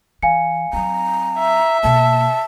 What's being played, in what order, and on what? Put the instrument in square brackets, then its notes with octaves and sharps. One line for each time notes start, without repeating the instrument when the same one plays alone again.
[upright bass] E3 [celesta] F5 G#5 C#7
[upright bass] F#3 C4 [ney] A#5
[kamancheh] E5
[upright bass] B2 A#3 [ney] A5